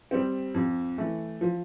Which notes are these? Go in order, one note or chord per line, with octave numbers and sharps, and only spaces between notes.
G3 C4
F2
E3 A3
F3